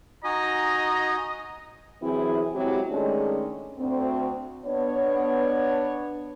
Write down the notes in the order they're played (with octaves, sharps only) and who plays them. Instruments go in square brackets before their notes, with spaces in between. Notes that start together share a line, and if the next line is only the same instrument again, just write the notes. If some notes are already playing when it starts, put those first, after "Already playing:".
[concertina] D#4 F#4 G#5 [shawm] D#5 [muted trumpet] A#5
[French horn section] C3 E3 F#3 C4 E4 G#4
F#3 G#3 C4 E4 G4
D#3 G#3 A3 C#4 D4
D2 C4
B3 D4 C#5